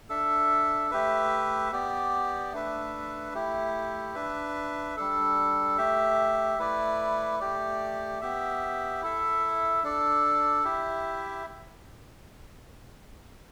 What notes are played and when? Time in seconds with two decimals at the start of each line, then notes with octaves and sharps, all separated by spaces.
0.09 D4 A4 E5
0.91 A3 G4 B4 E5
1.72 B3 G4 D5
2.52 A3 D4 B4 E5
3.33 A3 E4 G4
4.15 D4 B4 E5
4.97 G3 D4 A4
5.78 A3 G4 E5
6.59 A3 E4 B4 D5
7.40 A3 G4 D5
8.21 B3 G4 E5
9.02 E4 A4 E5
9.84 D4 A4 D5
10.64 E4 G4 E5